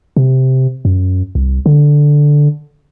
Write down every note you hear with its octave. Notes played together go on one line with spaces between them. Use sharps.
C3
F#2
C2
D3